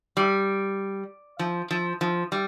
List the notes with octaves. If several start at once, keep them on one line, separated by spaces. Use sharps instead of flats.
G3
F3
F3
F3
G3